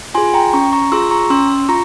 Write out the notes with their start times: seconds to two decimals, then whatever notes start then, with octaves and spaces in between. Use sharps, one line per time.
0.15 F4 G#4 G#5 C6
0.34 G5 A#5
0.53 C#4 A#5 C#6
0.73 A#5 C#6
0.92 F4 G#4 C6 E6
1.11 A#5 C#6
1.30 C#4 C6 E6
1.69 F4 A#5 C#6